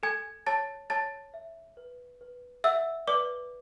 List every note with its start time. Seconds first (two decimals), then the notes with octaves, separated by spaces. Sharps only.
0.03 A4 G#5 G#6
0.46 C#5 A5 A6
0.90 C#5 A5 A6
1.34 E5
1.77 B4
2.21 B4
2.64 E5 F#5 E6
3.07 B4 D5 D6